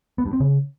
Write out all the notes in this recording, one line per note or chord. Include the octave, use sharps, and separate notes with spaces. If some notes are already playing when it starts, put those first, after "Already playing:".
B3
G2
C4
C#3